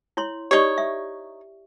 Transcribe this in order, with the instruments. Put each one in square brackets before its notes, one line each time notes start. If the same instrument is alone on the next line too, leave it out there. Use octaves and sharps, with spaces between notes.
[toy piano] E4 C#5 C6
[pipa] D#4 C#5 [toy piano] G4 D5 C#6
[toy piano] E5